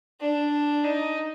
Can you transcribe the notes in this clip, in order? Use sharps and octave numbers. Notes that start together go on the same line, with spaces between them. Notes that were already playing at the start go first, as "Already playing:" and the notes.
D4
D#4